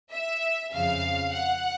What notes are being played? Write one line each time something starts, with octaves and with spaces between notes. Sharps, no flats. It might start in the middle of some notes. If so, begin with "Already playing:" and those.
E5
F2 C#3 F3 F5
F#5